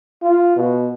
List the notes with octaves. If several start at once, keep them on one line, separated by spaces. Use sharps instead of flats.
F4
B2